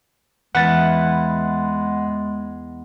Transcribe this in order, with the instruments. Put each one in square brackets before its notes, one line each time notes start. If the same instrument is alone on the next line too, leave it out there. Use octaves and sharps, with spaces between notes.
[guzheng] E2 E4 B4 [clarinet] G#3 [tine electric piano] F#5 A6